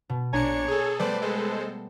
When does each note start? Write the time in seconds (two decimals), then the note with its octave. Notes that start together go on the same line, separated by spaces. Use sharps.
0.09 B2
0.33 A#1 D4 C#5 G#5 A#5 C#7
0.68 G#4 A4
0.99 G3 A3 B3 B4 C5 D5
1.22 G#3 A4 C5